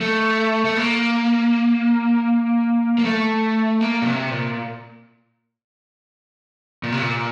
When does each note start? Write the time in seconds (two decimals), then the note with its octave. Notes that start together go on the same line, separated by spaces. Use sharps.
0.01 A3
0.65 A3
0.77 A#3
2.98 A#3
3.04 A3
3.81 A#3
4.02 A#2
4.06 C3
4.31 A#2
6.83 A#2
6.92 C3
7.01 A#2